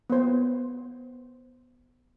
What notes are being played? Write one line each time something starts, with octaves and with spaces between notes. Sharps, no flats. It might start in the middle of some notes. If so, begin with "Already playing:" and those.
B3 C5